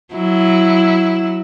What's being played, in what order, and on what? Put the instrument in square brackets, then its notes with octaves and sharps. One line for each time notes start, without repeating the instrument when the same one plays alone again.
[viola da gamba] F#3 E4